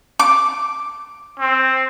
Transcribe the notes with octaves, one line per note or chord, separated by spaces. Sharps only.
D6
C4